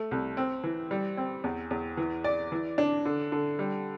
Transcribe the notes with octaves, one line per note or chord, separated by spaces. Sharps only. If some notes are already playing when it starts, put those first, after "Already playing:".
Already playing: A3
C2
C4
E3
G3
C4
E2
E2
E3
D5
E3
D4
D3
D3
G3